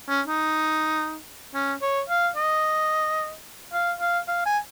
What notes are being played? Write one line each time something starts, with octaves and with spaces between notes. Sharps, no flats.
C#4
D#4
C#4
C#5
F5
D#5
F5
F5
F5
G#5